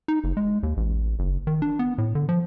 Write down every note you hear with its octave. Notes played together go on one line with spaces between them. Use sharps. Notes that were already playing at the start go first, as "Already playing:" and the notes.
D#4
F#1
G#3
D#2
A1
F#1
D#3
D4
B3
A2
D3
F3